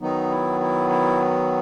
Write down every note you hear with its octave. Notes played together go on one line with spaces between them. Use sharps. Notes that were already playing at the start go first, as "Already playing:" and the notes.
D#3 F#3 B3 D#4
E4
E4
E4